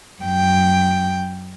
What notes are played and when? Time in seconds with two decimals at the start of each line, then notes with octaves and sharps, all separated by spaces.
0.22 F#2 G5